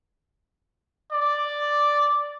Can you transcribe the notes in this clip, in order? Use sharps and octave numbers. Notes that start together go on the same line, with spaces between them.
D5